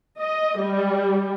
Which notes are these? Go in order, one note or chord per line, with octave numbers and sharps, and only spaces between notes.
D#5
G3